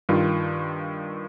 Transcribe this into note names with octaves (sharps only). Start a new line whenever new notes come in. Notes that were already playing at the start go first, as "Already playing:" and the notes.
G2 D#3 F4